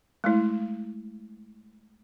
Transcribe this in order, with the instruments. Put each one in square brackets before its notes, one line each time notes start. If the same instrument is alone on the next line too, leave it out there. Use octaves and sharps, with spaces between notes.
[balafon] G#3 A3 E4